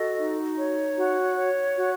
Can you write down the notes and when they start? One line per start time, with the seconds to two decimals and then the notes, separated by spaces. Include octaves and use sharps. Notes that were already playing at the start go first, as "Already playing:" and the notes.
Already playing: F#4 A4 D#5
0.18 D#4
0.57 C#5
0.97 F#4
1.36 C#5
1.76 F#4